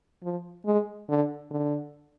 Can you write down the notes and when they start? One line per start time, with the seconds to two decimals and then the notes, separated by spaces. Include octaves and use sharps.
0.23 F3
0.65 G#3
1.09 D3
1.51 D3